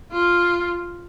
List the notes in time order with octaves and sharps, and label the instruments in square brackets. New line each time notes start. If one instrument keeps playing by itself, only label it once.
[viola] F4